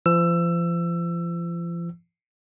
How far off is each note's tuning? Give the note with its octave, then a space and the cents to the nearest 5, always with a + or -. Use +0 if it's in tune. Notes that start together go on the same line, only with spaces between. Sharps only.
F3 -40 E6 +20